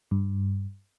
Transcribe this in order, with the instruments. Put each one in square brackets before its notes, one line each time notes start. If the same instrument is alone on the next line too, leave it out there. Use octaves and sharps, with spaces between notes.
[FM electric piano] G2